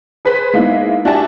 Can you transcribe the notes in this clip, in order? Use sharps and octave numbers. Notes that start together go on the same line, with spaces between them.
G#4 B4 C5 B6
G#3 A#3 B3 D#4 E4
D4 F#4 G4 E5 G#5 A5